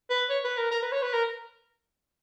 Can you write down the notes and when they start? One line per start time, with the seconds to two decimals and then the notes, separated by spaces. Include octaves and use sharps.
0.10 B4
0.30 C#5
0.44 B4
0.57 A#4
0.71 A#4
0.82 B4
0.92 C#5
1.02 B4
1.13 A#4